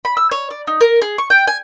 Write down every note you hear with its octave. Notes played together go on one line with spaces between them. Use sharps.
B5
E6
C#5
D5
D#4
A#4
G#4
C#6
G5
G#5